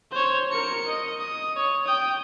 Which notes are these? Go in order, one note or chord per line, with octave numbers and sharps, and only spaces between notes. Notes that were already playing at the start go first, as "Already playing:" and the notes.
C5 C#5
A#4 C#7
D#5
D#6
C#5
G5 D#6